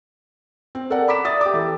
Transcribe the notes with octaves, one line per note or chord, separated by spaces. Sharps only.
C4
A4 A#4 D5 F#5
A#5 B5 D6 B6 E7
D5 E5 D#6 A6
G4 D6
E3 A4